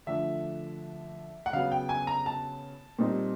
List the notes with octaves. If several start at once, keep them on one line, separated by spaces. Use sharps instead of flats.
D3 F3 A3 D4 E5
F#5
C#3 F#3 B3 F5
G5
G#5
A#5
A5
A#2 G3 C4 D#4